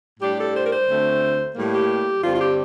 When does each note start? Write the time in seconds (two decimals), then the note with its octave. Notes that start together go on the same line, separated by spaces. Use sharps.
0.20 A2 G3 D4 G4
0.38 A4
0.54 C5
0.65 A#4
0.70 C5
0.87 D2 D3 A3 C4
1.54 A2 G3 A#3
1.72 G4
2.22 G2 D3 G3 C4 F4
2.34 F4
2.39 G4